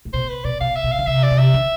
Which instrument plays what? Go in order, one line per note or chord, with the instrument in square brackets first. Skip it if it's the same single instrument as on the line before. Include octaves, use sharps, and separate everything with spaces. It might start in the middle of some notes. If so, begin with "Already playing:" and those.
[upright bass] A2
[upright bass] B2 [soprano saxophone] C5
[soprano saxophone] B4
[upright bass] B2 [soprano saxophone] D5
[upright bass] B2 [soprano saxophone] F5
[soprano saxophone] E5
[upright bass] B2
[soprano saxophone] F5
[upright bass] D3
[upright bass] C3 [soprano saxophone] E5
[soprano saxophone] D5
[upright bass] C3
[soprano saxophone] E5
[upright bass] D3